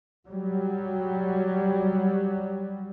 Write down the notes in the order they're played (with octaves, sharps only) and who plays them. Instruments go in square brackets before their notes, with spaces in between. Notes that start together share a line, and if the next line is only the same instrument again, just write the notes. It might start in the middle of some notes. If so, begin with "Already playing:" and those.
[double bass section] F#3 G3